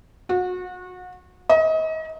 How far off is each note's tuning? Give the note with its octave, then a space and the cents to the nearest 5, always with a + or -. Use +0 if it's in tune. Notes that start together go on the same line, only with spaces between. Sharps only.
F#4 -30
D#5 +35